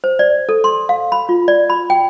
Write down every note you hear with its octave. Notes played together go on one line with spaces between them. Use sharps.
C5
D5
A4
C6
F5
B5
F4
D5
B5
G5